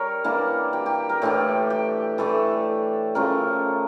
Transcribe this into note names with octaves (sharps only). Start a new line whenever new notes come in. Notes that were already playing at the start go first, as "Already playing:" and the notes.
Already playing: G3 A#4 C#5
E3 A#3 D4
G4
G4
A#4
A2 E3 A3 D4 G4
G4
E3 A3 D4 A4
C#3 F3 A3 A#4